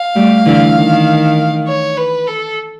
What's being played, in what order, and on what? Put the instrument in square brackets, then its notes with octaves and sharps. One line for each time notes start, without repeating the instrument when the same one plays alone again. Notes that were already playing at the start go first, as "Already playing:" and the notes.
Already playing: [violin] F5
[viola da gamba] G3 A3
D3 E3
D#3
[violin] C#5
B4
A4